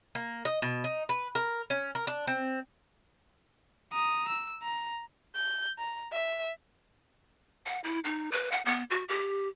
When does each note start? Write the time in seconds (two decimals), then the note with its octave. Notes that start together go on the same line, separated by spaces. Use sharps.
0.15 A#3
0.45 D#5
0.62 B2
0.84 D#4
1.09 B4
1.35 A#4
1.70 C#4
1.95 A#4
2.07 D4
2.27 C4
3.93 A#5 D#6
4.28 E6
4.63 A#5
5.35 G6
5.78 A#5
6.12 E5
7.66 F#5
7.84 E4
8.04 D#4
8.32 B4
8.52 F#5
8.65 B3
8.90 F#4
9.08 G4